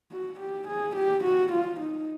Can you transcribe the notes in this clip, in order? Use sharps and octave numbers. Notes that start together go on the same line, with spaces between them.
F#4
G4
G#4
G4
F#4
F4
D#4